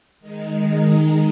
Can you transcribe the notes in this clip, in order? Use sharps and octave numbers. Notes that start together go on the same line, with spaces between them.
D#3 G#3 D#4